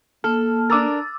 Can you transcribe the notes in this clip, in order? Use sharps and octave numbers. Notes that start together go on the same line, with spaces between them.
A#3 A4 F6
D4 A#4 D6 E6 A6